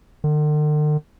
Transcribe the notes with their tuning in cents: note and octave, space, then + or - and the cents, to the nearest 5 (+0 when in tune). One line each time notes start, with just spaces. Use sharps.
D3 +45